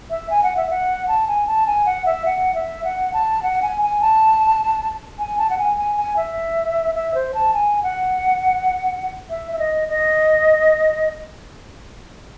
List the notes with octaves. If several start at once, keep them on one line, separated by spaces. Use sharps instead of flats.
E5
G#5
F#5
E5
F#5
A5
G#5
A5
G#5
F#5
E5
F#5
E5
F#5
A5
F#5
G#5
G#5
A5
G#5
A5
F#5
G#5
G#5
G#5
E5
E5
C5
A5
G#5
F#5
E5
E5
D#5
D#5